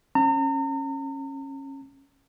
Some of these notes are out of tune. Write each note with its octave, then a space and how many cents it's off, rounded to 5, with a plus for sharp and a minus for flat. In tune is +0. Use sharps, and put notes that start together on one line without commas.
C#4 -20 A#5 -40